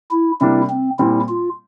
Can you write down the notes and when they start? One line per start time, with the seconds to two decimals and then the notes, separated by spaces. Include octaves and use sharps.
0.11 E4
0.41 C3 G3 A#3 D4 E4
0.69 C4
0.99 A#2 G3 C4 E4
1.29 F4